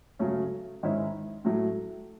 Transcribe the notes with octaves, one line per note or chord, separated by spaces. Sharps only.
C#3 F#3 A3 C#4
G#2 D#3 G#3 C#4 E4
A2 F#3 A3